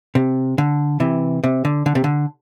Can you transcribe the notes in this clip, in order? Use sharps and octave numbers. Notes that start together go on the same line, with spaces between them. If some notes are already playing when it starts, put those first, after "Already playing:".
C3
D3
C3 E3
C3
D3
D3
C3
D3